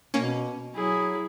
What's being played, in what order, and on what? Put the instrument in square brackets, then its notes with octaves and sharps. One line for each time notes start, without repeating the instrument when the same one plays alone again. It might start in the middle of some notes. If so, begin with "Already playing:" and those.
[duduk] B2 [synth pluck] A#3 C#4
[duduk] F#3 [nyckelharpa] E4 G#4